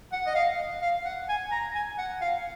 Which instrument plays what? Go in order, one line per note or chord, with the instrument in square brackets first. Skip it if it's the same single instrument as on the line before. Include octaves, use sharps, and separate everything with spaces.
[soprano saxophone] F#5
D#5
F5
F5
F#5
G#5
A#5
G#5
F#5
F5